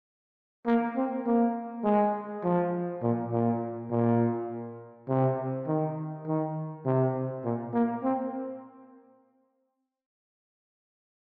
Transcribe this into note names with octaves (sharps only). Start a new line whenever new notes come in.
A#3
C4
A#3
G#3
F3
A#2
A#2
A#2
C3
D#3
D#3
C3
A#2
A#3
C4